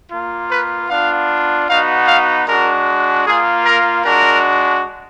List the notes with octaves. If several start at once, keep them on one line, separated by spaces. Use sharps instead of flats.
A#3 F4
B4
B3 D4 F4 F5
B3 D#4 F#4 F5
F5
G#3 D4 F#4 A#4
A#3 F4 G#4
A#4
G#3 D4 F#4 A#4